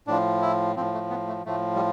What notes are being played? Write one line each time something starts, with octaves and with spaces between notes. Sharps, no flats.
A2 F3 D4
E4
A2 F3 C4
A3
B3
A3
A2 F3 A3
G3